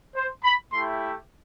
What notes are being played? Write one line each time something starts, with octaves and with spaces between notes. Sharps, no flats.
C5
B5
A3 E4 G4 C6